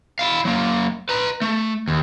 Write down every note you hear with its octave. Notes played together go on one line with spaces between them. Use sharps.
E4 F5
F#3 A#3
B4 A#5
A3
D#2